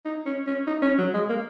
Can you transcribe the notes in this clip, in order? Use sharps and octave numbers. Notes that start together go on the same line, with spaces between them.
D#4
C#4
C#4
D#4
C#4
F#3
G#3
A#3